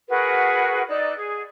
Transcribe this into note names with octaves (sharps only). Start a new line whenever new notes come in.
F#4 G#4 A#4 B4
D#4 D5 E6 F#6
G#4